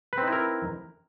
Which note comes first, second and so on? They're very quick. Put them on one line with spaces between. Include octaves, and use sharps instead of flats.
B4 C4 D#4 E4 A#4